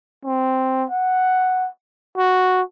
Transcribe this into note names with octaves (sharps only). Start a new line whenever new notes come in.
C4
F#5
F#4